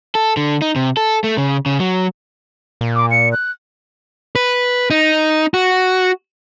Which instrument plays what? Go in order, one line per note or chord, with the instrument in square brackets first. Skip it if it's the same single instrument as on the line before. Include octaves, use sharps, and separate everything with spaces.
[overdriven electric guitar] A4
D3
D#4
C3
A4
A3
C#3
C#3
F#3
[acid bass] A#2
[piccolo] D6
C#7
F#6
[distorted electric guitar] B4
D#4
F#4